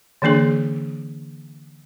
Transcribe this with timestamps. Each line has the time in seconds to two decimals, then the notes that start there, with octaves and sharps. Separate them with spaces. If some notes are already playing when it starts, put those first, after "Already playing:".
0.22 D3 E3 A#3 D4 G#4